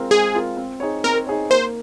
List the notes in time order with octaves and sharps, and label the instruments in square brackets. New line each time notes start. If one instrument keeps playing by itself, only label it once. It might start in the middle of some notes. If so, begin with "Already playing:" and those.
Already playing: [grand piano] G#3 C4 F4 A#4
[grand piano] G#3 [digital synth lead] G#4
[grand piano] C4 F4 A#4
C4
D#4 G#4 C#5
[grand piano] C4 [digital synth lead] A#4
[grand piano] D#4 G#4 C#5
[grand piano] A#3 [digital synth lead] C5